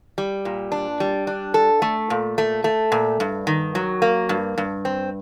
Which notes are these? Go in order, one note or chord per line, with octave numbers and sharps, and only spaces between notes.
G3
A#2
D4
G3
D4
A4
A3
A#2
A3
A3
A#2
G2
D#3
F#3
A#3
G2
G2
C4